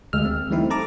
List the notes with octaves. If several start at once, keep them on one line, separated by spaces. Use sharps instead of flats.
D2 G#3 E6 F6
C4
E3 G3 A3 C4 D#4 E4
A4 A5 A#5 D6